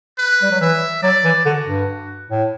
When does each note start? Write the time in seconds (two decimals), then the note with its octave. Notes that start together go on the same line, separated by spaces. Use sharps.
0.18 B4
0.43 G3
0.51 F#3
0.61 E3 E5
1.03 F#3 D5
1.25 E3
1.45 D3 F#4
1.67 G2
2.31 A2